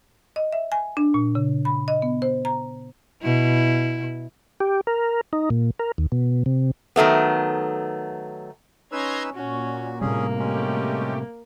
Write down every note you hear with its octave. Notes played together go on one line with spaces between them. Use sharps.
D#5
E5
G#5
D4
A#2
C#3
B5
D#5
B3
C5
A#5
B2 E4
G4
A#4
D#4
A#2
A#4
D#2
B2
C3
D#3 F#3 A3 B3
C#4 D#4 B4 A#5 C6 E6 G#6
A#2 C#4 F#4
A2 C3 G3 A#3 C#4 G#4
G#3 A3 C#4 G4